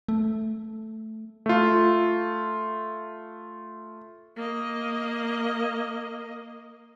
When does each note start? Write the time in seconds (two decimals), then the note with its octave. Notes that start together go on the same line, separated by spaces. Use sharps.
0.08 A3
1.46 A3 F4
4.36 A#3 D#5